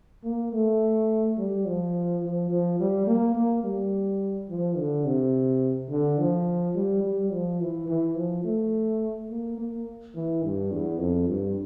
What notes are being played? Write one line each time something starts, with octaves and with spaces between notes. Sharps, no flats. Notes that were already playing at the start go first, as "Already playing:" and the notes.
A#3
A3
G3
F3
F3
F3
G3
A#3
A#3
G3
F3
D3
C3
D3
F3
G3
G3
F3
E3
E3
F3
A3
A#3
A#3
E3
G2
E2
F2
G2